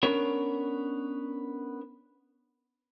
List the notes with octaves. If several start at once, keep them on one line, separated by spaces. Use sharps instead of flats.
B3 C#4 D4 A#4 C#5